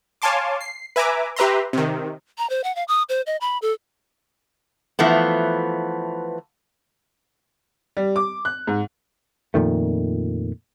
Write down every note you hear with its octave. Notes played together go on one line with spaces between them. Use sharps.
C#5 F5 G#5 A5 C6 D6
C7
B4 E5 G#5 A#5 D6
G4 B4 E5 A#5 C6
C3 D#3
A#5
C5
F#5
F5
D#6
C5
D#5
B5
A4
E3 F3 A3 B3
G3
D6
F#6
G#2
F2 A#2 D#3 A3